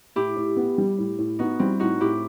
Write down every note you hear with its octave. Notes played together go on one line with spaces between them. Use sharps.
A2 E4 G4
A2
B3
G3
A2
A2
B3 D#4 F#4
G3 C4 E4
A2 D#4 F#4
A2 E4 G4